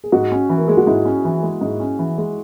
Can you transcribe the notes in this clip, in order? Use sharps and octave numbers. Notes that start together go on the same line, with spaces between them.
G#4
G#2 F#4
C#4
E3
A#4
G#3 G#4
F#4
G#2 E4
C#4
E3
G#3
G#2
C#4
E3
G#3